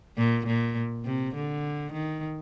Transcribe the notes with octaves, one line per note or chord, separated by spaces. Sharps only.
A#2
A#2
C3
D3
D#3